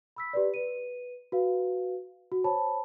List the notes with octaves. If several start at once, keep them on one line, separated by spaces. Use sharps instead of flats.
B5 E6 B6
G4 B4 D5
B4 D#7
F#4 B4 F5
F#4
C5 C#5 A5 B5